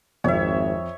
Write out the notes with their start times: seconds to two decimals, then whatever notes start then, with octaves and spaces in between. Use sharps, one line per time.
0.24 G#1 F2 C#5 E5